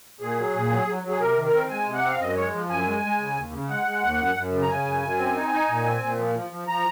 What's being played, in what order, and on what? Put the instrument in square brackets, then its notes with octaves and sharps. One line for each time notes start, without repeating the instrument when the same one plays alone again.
[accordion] A#2 G#4
F#3
A#2
F#3
F#3
F#3
G#4
C3 A#4
D#3
A#4
C4
G#3 G#5
C3
F#5
C4
F5
F#2 D#5
G#3 C#5
F3
F#2 G#5
G#3
G#3
C#3
D#2
C#3
G#3 F#5
G#3
D#2
F#2
F#2
C#3
A#5
C#3 G#5
F#2
F#2
C4
D#4
D#4
A#2
C4
A#2
F3
F3
F3
F3 A#5